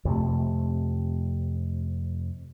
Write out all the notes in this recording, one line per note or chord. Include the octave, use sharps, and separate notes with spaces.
F2 C3 A3